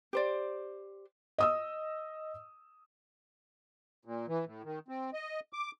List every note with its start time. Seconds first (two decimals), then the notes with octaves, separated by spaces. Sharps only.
0.13 G4 C5 D5
1.38 D#5 D#6 E6
4.05 A#2
4.28 E3
4.45 A2
4.64 D#3
4.88 C4
5.13 D#5
5.53 D6